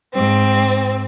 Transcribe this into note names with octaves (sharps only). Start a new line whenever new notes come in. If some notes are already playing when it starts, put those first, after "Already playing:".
G#2 C4